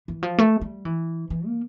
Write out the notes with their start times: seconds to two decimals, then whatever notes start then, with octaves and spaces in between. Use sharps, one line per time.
0.08 E3
0.23 F3
0.38 A3
0.61 G3
0.85 E3
1.30 E3
1.46 A#3